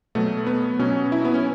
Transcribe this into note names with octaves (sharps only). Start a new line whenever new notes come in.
B2 F#3 A3
B3
B2 F#3 C#4
E4
B3
C#4